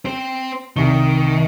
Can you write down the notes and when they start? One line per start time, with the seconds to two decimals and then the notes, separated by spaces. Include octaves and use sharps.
0.05 C4 C5
0.76 C2 D#3 C#6 G7